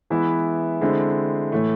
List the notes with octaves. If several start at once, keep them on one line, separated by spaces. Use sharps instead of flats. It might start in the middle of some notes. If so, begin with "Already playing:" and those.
E3 G#3 B3 E4
D3 G#3 C4 E4
A2 E3 A3